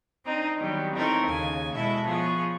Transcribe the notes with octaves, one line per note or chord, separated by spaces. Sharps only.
C4 D4 D#4 D#5 A#5
D#3 F#3 G3 B3
C4 D#4 E4 A4 A#4 C#5
D#2 C#3 G#5
B2 G#3 E4 A4 E5
F3 B3 G#4 C#5